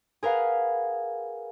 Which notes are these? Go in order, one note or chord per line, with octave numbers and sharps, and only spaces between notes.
G#4 A#4 B4 F5 F#5